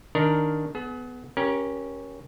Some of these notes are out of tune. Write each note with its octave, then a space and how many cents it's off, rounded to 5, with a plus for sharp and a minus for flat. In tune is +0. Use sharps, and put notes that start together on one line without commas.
D#3 +0 D4 +0 A#4 +0
B3 +10 G#4 +40
C#4 +0 G4 +0 A#4 +20